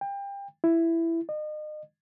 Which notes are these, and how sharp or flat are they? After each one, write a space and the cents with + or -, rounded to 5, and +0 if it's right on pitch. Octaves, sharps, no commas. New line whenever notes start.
G5 +30
E4 +10
D#5 -35